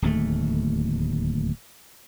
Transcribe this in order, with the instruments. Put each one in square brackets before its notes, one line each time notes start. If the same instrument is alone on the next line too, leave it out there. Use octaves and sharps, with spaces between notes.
[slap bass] D1 D#2 A3